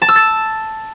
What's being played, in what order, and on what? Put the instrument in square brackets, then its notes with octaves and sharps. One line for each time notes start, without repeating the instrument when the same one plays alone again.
[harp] A5
E6
A6